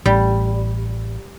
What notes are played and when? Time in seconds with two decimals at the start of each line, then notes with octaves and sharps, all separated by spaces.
0.06 A1 G3